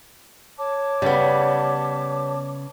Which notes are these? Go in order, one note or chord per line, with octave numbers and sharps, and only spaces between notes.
C#5 A5 D6
C#3 G3 B3